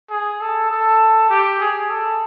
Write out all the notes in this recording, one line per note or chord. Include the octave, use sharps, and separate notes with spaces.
G#4
A4
A4
G4
G#4
A4